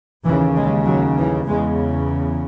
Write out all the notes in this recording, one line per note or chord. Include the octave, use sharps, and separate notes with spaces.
D#2 C#3 E3
G#3
F#3
E3
E2 C#3 G#3